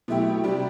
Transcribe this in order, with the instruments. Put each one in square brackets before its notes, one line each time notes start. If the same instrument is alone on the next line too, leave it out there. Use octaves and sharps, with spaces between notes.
[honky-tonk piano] B2 F#3 A3 E4 G4
C3 G3 D4 G4